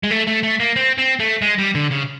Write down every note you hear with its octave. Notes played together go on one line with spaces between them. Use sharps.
G#3
A3
A3
A3
A#3
C4
C4
A3
G#3
G3
D3
C#3